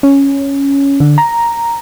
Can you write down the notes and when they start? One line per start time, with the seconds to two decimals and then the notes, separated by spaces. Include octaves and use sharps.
0.03 C#4
1.00 D3
1.18 A#5